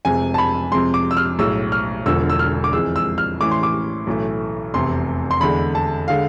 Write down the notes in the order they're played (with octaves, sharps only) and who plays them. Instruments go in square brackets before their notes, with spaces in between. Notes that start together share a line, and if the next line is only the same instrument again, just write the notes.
[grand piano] F1 F2 C3 G#3 G#5
A5
B5
F2 C3 G#3 C6
D6
E6
F6
B1 A2 G#3 E6
F6
E1 E2 D3 F3 E6
E6
F6
D6
F2 E3 G#3 E6
E6
F6
A1 A2 E3 D6
C6
D6
B1 A2 E3 A3
F1 E2 C3 C6
C6
E2 D3 G#3 B5
A5
D3 G#3 F5